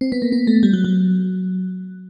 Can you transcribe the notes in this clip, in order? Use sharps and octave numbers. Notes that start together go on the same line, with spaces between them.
C4
B3
A#3
B3
A3
G3
F#3
F#3